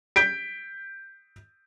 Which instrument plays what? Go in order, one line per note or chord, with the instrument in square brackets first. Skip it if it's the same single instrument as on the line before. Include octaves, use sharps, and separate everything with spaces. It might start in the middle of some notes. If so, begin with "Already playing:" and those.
[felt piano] G6 B6 D7